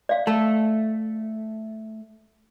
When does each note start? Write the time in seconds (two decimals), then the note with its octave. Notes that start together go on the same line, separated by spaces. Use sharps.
0.09 D5 F5
0.27 A3 A5